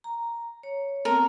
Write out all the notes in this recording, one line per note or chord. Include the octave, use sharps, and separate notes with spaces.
A#5
C#5
A3 B3 C4 A#4